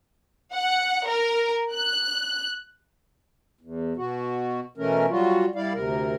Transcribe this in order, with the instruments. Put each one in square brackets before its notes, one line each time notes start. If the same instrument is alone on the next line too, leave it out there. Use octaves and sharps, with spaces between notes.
[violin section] F#5
A#4
F#6
[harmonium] E2
B2 F#4
B2 E3 A3 C#4 A#4
F#3 G3 F4 F#4
G3 E4 D5 F5
D2 C3 A#4